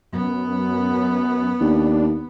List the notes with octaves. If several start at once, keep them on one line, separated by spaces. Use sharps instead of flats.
F#2 B3
D#2 D4